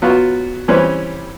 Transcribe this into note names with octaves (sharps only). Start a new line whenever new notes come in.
F#3 B3 F4 F#4
E3 G3 C4 C#4 B4 C5